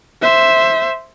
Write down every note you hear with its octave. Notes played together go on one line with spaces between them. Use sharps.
C5 E5